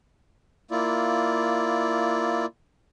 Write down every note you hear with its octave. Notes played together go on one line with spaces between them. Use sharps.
A#3 E4 F4 D5